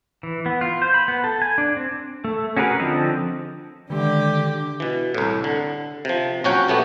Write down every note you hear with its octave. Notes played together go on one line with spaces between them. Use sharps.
E3
B3
F4
C5
B5
B3
A4
G#5
D4
C4
A3
C#4 F#4 G#4 A#4 B4
D3 F3 C4 D#5
D3 D#3 G#3 G4
B2 E3
C2 A2
D3
C3 F3
A#1 F#3 C#4 C#5 F#5 G5
C3 A3 B3 G4